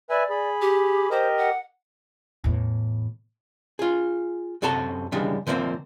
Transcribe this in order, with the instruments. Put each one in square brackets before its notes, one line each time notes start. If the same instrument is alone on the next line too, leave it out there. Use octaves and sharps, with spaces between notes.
[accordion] B4 E5 G#5 [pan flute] D5
[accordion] G#4 B5
[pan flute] G4
[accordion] G4 A#4 D#5 [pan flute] C5
[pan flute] F#5
[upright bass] E2 A2
[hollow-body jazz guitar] F4 G#4
F#2 C3 F#4 A4 A5 A#5
C#3 E3 G3 G#3 D4
D3 F3 A3 A#3 C4